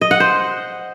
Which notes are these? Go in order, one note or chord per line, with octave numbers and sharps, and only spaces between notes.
D#5
F#5
C5